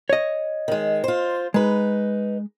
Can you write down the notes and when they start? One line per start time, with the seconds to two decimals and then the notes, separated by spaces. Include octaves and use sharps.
0.10 C#5 D#5
0.68 D#3 G#3
1.04 F4 C5
1.54 G#3 D#4 B4